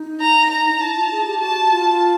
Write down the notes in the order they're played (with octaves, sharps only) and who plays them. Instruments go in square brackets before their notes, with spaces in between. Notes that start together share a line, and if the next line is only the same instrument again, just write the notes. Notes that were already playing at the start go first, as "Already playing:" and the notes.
Already playing: [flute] D#4
[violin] A#5
A#5
[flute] D#4
[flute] E4 [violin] A5
[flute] F4
G#4
G4
[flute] F#4 [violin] A5
[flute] F4